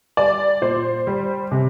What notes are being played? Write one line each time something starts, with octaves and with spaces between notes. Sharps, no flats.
G3 D5
A#2 C5
G3
C3